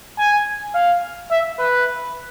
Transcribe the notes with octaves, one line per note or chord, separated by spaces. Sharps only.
G#5
F5
E5
B4